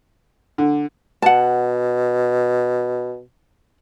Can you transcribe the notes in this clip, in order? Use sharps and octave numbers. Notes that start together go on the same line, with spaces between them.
D3
B2 F#5 A5